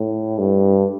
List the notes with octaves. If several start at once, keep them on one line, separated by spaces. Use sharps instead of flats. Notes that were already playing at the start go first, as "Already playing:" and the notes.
Already playing: A2
G2